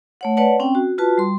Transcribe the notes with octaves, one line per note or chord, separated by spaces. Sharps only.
A3 C#5 F#5
B4 C#5 D5 F#5 A5
C4 C#4 G5
F#4
F4 F#4 B4 A5
G3 C6